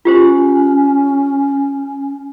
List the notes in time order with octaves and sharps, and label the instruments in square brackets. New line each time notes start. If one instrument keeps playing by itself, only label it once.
[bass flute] C#4 [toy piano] F4 G4 C5